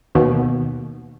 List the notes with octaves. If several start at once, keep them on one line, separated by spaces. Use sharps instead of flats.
D#2 B2